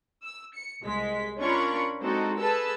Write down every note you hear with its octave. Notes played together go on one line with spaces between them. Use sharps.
E6
C#7
C2 G#3 B6
C#4 D4 F4 A#4 B5 C#6
G#3 C4 D#4 F#4 A4
G#4 A4 B4 A5 E6